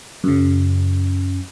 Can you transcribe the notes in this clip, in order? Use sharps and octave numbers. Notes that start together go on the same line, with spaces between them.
F#2 C#3